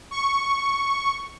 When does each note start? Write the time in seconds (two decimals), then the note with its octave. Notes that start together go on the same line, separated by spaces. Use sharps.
0.11 C#6